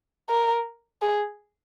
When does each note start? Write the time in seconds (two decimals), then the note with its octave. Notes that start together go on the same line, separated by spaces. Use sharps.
0.29 A#4
1.02 G#4